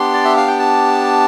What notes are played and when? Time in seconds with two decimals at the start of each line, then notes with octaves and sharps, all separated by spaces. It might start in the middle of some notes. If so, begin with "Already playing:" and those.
Already playing: B3 D4 G4 C6
0.13 D5
0.25 E5
0.37 F5
0.48 G5
0.59 A5